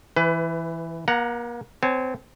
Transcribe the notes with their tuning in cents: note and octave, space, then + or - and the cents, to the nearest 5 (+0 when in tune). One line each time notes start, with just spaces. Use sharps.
E3 +0 B4 +30
A#3 +40 F#5 +5 A#5 +0
C4 -25 C#5 -25 G#5 +30